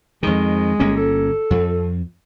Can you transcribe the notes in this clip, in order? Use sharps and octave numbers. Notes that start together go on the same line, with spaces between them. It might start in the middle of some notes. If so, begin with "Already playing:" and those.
F2 D#3 G#3
G1 A#3 C#4
A4
F2